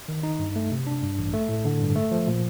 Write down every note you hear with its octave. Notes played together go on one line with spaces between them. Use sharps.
D#3
D#4
G2
A3
C3
D4
G2
A1
A3
A2
D3
G2
A3
F3
A#2